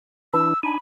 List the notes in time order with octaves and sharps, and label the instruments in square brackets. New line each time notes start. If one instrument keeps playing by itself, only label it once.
[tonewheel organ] E3 D4 E4 [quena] E6
[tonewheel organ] D4 D#4 G#5 [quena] B5